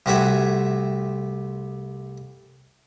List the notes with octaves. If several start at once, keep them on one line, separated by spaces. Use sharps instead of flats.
C2 C3 A3 F#4 E5 G#5